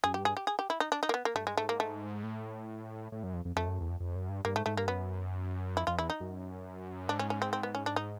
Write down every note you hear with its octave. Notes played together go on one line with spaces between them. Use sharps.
F#2 G#4
G4
G2
G#4
G4
G#4
G4
E4
D#4
D4
D#4
A#3
B3
A#3
G2 A3
G#3
G#2 A3
A#3
A3
A2
A2
F#2
F2
F2
F2 A3
F#2
E2
F2
F2
F#2
G2
G2 A#3
G#2 A3
G#2 A3
G2 A#3
F#2 B3
F2 E4
F2 F4
E2 E4
D#4
F#2
G#2 D4
C#4
C#4
C4
C4
B3
C#4
D4
D#4